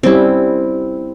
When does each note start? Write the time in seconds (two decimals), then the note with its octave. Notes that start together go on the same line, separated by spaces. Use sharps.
0.03 G3 C4 C#4 E4